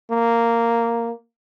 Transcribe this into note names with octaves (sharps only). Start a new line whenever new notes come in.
A#3